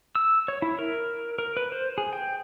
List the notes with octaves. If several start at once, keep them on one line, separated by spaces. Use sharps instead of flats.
E6
C#5
E4
A#4
A#4
B4
C5
G#4
G5